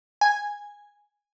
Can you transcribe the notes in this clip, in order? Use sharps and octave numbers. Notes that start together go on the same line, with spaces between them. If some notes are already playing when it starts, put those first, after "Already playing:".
G#5